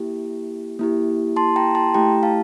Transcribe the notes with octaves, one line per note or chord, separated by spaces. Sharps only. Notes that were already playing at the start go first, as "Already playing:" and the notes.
Already playing: A#3 E4 G4
A#3 E4 G4
A5 C6
G5 A#5
A5 C6
A3 E4 G4 G5 A#5
F5 A5